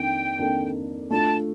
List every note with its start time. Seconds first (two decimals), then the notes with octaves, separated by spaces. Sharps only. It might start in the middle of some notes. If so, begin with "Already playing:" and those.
Already playing: F2 D#3 A#3 D4 G5
0.38 F2 D#3 A#3 D4 A4
1.10 A3 D4 F4 A5